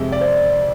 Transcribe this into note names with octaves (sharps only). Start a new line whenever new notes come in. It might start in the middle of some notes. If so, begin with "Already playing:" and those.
Already playing: F2 C3 G#3 E5
D5
C5